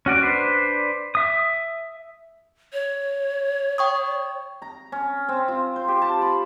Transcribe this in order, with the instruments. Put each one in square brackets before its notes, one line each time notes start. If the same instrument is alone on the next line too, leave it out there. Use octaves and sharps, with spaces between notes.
[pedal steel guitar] C#4 F#4 D5
D4 B4 C5
E5 D#6
[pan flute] C#5
[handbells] G5 C#6 D#6
[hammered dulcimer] A#5
C#4
C4
F4
C5
G4
A5
B5